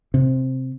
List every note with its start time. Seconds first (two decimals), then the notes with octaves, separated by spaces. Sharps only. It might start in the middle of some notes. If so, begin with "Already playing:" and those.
0.14 C3